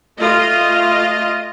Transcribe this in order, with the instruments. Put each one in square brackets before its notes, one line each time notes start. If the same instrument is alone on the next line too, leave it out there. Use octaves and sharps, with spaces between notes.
[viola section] A3 F4 D#5